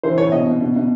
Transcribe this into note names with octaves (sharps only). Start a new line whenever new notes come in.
E3 C5
E3 C#5
B2 D#5
B2
B2
B2